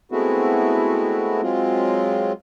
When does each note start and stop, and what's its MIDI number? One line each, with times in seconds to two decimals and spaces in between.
0.12 1.41 56
0.12 1.41 57
0.12 1.41 59
0.12 1.41 60
0.12 1.41 64
0.12 1.41 66
1.43 2.32 54
1.43 2.32 56
1.43 2.32 60
1.43 2.32 65